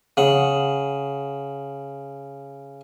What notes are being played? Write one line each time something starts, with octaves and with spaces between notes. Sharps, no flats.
C#3 F#5